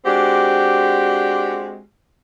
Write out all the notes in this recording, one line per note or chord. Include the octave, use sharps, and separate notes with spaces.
G#3 C4 D4 F#4 G4